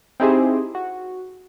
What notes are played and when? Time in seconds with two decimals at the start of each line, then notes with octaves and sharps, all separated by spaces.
0.20 C4 D#4 E4 G4 G#4 C5
0.75 F#4